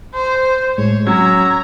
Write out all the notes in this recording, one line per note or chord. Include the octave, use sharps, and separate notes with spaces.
C5
A2 G#3 C#5
F#3 C#4 A#5 E6 G#6